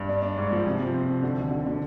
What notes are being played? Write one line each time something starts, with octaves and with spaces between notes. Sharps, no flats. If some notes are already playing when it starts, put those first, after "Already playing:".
Already playing: G2
D4
D4
G#2
F3
C3
F3
C4
C3
D3
D#2
D3
D3